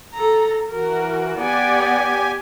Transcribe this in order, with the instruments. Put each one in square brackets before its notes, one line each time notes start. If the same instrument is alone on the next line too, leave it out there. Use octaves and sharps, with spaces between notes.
[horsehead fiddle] A4 A#5
[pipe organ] E3 F#4 [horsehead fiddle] A#4
[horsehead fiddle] B3 D5 [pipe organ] G4 G#5